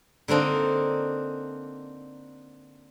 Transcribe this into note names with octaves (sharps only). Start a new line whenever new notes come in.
D3 A#3 C4 D4 D#4